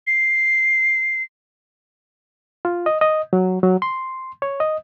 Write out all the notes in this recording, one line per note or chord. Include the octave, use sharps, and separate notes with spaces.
C7
F4
D#5
D#5
F#3
F#3
C6
C#5
D#5